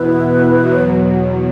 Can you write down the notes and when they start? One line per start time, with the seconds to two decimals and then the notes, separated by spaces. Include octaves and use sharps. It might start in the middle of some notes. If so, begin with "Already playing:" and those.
Already playing: E2 B2 B3 E4 B4
0.63 E2 B2 F#3